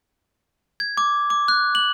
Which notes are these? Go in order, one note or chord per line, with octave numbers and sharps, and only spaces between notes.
G#6
D6
D6
F#6
F#7